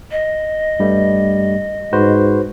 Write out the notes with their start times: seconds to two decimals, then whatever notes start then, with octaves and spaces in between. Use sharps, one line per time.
0.11 D#5
0.79 G2 G3 A3
1.93 G#2 F#4 B4 C5